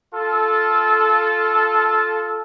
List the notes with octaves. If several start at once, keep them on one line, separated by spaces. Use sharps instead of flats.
F4 A4